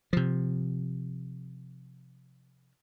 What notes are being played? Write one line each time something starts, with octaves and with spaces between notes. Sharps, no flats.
C3 F3